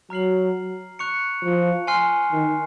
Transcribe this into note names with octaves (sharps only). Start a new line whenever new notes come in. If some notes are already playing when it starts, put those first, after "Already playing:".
F#3 A#5 F6 C7 F#7
C#6 F#6 C#7 F7
F3
G#5 C6 F6 C7
D#3